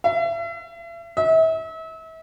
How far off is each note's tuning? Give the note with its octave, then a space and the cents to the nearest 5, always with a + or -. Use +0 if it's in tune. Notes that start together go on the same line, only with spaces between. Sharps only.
E5 +40
E5 -35